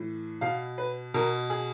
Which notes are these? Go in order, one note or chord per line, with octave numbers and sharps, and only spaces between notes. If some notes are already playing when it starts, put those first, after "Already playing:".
Already playing: A2 E3
B2 F5
B4
B2 A#4
G#4